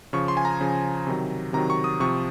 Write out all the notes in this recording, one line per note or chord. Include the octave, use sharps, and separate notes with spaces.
C#3 F3 C#6
C6
G#5
A#5
C#3 F3
C3 D#3 F#3
C3 D#3 F#3 A#5
C#6
D#6
C3 F3 C#6